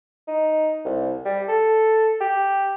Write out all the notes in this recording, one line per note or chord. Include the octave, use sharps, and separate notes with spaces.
D#4
C2
G3
A4
G4